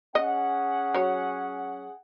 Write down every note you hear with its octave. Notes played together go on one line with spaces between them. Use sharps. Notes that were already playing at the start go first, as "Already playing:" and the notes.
C#4 G#4 D#5 F#5
F#3 C#5